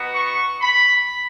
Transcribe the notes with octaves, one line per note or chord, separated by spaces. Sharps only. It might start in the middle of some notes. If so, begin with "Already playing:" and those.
Already playing: B3 D#4 F#4
C#6
B5